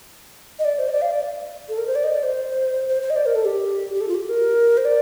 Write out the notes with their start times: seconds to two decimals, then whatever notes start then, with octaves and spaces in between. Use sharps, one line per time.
0.59 D#5
0.65 D5
0.78 C5
0.89 D#5
0.93 D5
1.02 F5
1.11 D5
1.69 A4
1.78 A#4
1.87 C5
1.95 D5
2.04 D#5
2.14 D5
2.23 C5
2.88 C5
3.03 C5
3.10 D#5
3.16 D5
3.26 A#4
3.35 A4
3.45 G4
3.94 G4
4.01 A4
4.08 F4
4.15 G4
4.29 A#4
4.77 C5
4.85 D5